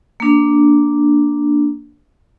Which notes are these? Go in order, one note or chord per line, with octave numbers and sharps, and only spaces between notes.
A#3 D4